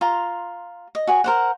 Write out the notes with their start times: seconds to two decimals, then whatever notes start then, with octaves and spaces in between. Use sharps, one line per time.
0.01 F4 A#5 C6
0.95 D#5
1.07 F#4 G#4 C#5
1.24 A#4 C5 F#5